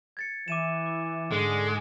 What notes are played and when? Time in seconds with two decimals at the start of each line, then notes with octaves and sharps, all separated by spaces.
0.17 G#6 A6 C#7
0.48 E3 D6 D#7 E7
0.86 D6
1.31 G#2 D3 G#3